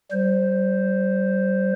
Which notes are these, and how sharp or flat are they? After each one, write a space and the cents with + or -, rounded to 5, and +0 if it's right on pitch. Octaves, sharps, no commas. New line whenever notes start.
G3 -35 C5 +0